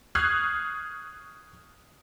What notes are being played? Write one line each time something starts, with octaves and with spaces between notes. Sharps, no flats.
C#6 D#6 F6 F#6 G#6 C7